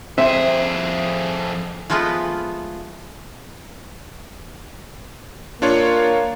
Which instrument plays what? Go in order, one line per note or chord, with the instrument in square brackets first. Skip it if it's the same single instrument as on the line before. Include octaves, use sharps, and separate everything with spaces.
[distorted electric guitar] F2 G#4 [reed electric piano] C4 C5 [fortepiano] E5
[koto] F3 G#3 A3 B3 F4 B4
[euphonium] A#3 [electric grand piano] D4 F4 C#5